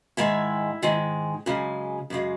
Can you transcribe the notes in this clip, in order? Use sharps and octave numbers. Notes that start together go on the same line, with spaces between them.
G#2 D#3 G#3 E4
G#2 D#3 G#3
F#2 C#3 G#3
F#2 C#3 G#3